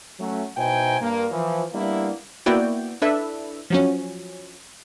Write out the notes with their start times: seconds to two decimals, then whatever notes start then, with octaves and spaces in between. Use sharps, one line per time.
0.19 F#3 A3 C#4
0.57 B2 D#4 E4 C5 G5 G#5
1.00 G2 A#3
1.31 E3 F3
1.73 G3 A#3 B3 D4 E4
2.46 A#3 B3 E4 F#4 D5 G5
3.02 D4 E4 A4 B4 E5
3.70 F3 F#3 C#4